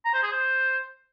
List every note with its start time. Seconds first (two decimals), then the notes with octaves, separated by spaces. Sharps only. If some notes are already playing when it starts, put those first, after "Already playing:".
0.05 A#5
0.14 C5
0.23 G#4
0.32 C5